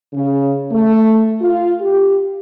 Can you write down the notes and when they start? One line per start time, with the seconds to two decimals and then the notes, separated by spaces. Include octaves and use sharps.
0.14 C#3
0.72 A3
1.42 F4
1.81 G4